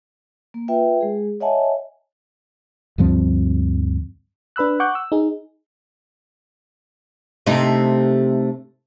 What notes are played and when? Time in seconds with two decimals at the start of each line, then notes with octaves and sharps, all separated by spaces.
0.54 A#3
0.68 F4 B4 E5 G5
1.01 G#3 G#4
1.40 C#5 D#5 E5 F#5 G#5 A5
2.98 D2 G2 F3 C4
4.56 D4 B4 B5 E6 F#6
4.80 F#5 C#6 D6 F#6 G6
4.95 E6
5.12 D#4 G#4
7.46 C3 A3 D#4